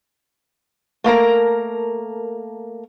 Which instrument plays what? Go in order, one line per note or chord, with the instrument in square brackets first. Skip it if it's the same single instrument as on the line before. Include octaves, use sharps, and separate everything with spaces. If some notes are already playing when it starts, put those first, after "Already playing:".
[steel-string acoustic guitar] A3 A#3 A#4 A#5